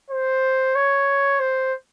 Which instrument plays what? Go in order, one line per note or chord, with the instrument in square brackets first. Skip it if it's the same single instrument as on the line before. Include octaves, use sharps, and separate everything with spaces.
[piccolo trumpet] C5
C#5
C5